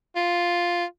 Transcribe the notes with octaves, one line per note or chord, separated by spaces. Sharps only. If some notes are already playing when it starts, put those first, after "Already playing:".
F4